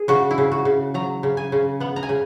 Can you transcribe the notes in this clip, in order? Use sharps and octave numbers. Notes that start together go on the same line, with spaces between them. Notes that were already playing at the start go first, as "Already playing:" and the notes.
Already playing: G#4
C#3 F#4
E4
C#3
F#4
C#3
F#3 A#5
C#3
G#5
C#3
B3 F#5
A#5
G#5
C#3